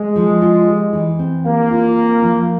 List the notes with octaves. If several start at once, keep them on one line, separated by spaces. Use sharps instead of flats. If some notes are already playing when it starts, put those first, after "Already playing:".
Already playing: G#3
F3
F4
G3
E3
C4
G3 A#3
F4
C4
F3